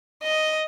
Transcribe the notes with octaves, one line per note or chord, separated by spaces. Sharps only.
D#5